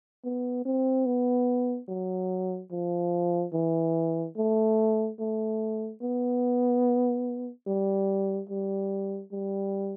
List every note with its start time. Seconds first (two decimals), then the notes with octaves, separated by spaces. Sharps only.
0.24 B3
0.65 C4
1.06 B3
1.89 F#3
2.71 F3
3.53 E3
4.37 A3
5.19 A3
6.02 B3
7.67 G3
8.49 G3
9.32 G3